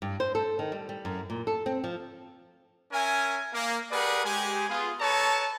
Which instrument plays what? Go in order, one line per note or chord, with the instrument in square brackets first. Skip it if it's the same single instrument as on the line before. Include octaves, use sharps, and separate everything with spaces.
[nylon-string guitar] G2
C5
A4
D#3
G3
G3
F#2
A#2
A4
C4
F3
[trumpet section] C#4 A#4 E5 G#5
A#3
G4 G#4 A#4 B4 D5 F#5
G#3 G4 G#5
B3 F4 G#4
A4 B4 C#5 A5 A#5 C#6